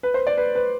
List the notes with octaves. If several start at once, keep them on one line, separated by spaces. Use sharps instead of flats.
B4
C5
D5
B4
B4